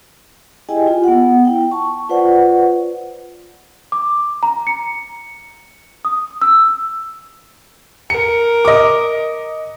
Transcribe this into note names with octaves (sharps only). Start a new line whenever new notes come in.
E4 G4 G#4 D#5 G5 G#5
F4
B3 F#5
E4 G5
A5 C#6
F4 B4 C5 D5 F#5
D6
A#5
C#7
D#6
E6
A#4 C#7
D#5 D6